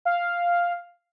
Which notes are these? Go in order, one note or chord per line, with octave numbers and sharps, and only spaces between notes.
F5